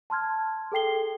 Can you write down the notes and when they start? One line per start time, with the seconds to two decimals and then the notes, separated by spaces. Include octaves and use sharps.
0.10 A5 C6 F6 G#6
0.72 G#4 A4 G5 C7 G7